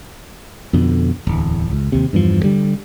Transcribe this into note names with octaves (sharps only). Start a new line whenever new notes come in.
F2 B2 D3
D1 E2
C#2
D#2 C3
E2 G2 C3 F3
D3 G3